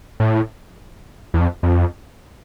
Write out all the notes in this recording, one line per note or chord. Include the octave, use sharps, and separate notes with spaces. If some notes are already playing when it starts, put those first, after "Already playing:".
A2
E2
F2
F2